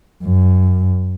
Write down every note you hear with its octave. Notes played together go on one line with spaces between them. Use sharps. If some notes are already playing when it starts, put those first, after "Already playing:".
F#2